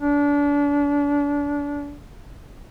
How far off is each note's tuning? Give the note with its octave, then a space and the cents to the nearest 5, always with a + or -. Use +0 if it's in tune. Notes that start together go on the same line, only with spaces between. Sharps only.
D4 -30